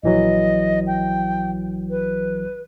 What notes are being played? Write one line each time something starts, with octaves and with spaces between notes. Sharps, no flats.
A#1 E3 F#3 D#5
G5
B4